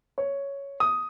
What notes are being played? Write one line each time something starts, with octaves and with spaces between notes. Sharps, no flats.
C#5
D#6